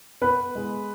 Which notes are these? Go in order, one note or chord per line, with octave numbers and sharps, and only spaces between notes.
B3 B4
G#3